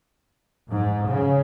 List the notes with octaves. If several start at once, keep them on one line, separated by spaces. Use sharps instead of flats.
G#2
C#3